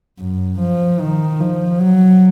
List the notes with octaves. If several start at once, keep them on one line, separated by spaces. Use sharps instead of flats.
F#2
F3
D#3
F3
F#3